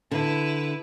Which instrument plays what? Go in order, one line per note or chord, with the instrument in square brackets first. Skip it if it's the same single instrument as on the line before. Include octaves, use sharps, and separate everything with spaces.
[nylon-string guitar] D3 [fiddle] E4 B4